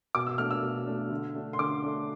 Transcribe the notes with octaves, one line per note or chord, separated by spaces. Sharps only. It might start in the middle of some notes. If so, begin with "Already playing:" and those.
B2 D6
E6
A3 D4 F6
E6
B2
A3 D4
D3
A3 D4
C6
D3 D6
A3 D4